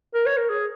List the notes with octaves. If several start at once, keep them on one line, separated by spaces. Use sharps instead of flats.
A#4
C#5
A#4
G#4